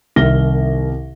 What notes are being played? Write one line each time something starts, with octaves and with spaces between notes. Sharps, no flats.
C2 D#3 E5 F6 A#6 G7